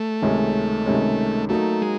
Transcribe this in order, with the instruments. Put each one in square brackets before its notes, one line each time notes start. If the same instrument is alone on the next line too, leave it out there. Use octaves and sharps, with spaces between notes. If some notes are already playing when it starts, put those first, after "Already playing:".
Already playing: [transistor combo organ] A3
[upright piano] C#2 C3 D#3 G#3 C#4
C#2 C3 D#3 G#3 C#4
[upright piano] F#3 A#3 D#4 [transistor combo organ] A3
[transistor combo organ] G#3